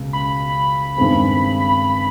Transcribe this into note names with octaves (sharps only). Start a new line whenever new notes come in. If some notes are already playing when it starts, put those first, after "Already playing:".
Already playing: C#2 B2 G#3
B5
G2 D#3 G#3 C4